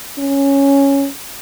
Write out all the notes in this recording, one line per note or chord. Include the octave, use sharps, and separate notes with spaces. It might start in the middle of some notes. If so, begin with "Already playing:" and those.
C#4